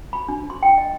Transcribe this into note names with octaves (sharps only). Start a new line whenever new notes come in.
B5
D4
C6
G5
D#5